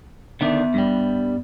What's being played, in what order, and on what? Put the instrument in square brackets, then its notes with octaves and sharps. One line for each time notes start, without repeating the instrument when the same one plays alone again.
[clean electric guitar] D3 D#3 D4 [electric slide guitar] B3 E5
[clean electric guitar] G2 G3